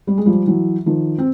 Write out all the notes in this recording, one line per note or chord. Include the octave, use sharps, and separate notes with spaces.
G3
G#3
F3 G3
E3 F#3
D#3 F3
C4